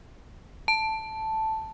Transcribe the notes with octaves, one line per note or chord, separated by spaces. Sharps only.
A5